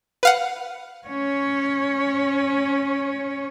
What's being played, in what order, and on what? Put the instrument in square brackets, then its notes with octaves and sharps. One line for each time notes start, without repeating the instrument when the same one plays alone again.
[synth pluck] B4 F5 F#5
[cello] C#4 C#5